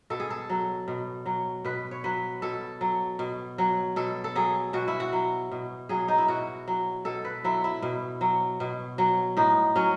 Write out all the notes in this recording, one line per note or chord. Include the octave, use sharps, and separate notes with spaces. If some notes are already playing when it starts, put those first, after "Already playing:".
B2 A4
G#4
A4
F#3
B2
F#3
B2 B4
C#5
F#3 B4
B2 A4
F#3
B2
F#3
B2 A4
A4
F#3 G#4
B2 F#4
E4
F#4
F#3
B2
F#3 G#4
D#4
E4
B2 F#4
F#3
B2 A4
B4
F#3 E4
E4
B2
F#3
B2
F#3
A2 D#4
F#3 C#4